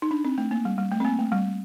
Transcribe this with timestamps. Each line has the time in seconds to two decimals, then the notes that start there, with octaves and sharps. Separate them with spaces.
0.02 D#4
0.11 D4
0.25 C4
0.38 A3
0.51 A#3
0.65 G3
0.78 G3
0.92 A3
1.00 C4
1.05 A#3
1.19 A3
1.32 G3